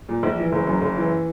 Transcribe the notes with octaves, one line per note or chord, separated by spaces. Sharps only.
A#2
A#1
E3
F#1
F#2
F#1
E3